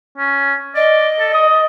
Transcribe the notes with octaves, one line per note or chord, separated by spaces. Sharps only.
C#4
D5 D#5
A4
D#6